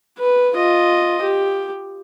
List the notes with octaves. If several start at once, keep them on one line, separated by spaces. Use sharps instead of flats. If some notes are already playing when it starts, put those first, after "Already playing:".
B4
F4 D#5
G4